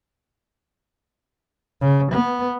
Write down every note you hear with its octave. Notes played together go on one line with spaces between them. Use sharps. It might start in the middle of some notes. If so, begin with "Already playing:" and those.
C#3
B3